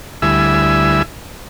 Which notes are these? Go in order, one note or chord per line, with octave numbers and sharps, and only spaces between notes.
D2 G3 E4 E5 G#5 E6